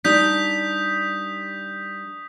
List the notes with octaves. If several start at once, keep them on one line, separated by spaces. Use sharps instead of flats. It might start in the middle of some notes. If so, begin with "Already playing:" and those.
G3 D4 D#4 D#6 G6 B6